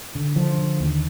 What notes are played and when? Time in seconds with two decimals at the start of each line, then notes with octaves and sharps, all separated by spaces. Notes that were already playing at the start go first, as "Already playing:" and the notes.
0.15 D3
0.36 D3 F3
0.58 D3
0.80 D#2